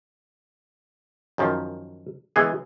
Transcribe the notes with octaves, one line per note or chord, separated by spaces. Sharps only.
F#2 D#3 F3
E3 G#3 B3 G#4